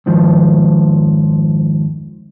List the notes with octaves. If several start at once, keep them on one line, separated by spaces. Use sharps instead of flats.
F2 G#2 D#3 F3